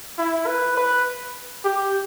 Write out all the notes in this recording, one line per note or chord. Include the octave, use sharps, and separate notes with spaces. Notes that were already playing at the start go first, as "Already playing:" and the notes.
E4
B4
B4
G4